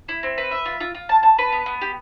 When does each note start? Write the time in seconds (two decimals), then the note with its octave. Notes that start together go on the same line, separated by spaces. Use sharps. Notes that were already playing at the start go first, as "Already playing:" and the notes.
0.09 E4
0.23 C4
0.38 B4
0.51 E5
0.66 F4
0.81 F4
0.95 F4
1.09 A5
1.23 A5
1.38 B4
1.52 B3
1.66 B3
1.82 G4